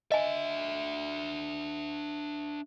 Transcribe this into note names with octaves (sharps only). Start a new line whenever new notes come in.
D4 D#5 E5 G#5